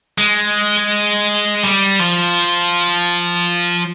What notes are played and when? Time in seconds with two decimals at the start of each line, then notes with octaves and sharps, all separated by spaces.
0.19 G#3
1.64 G3
2.00 F3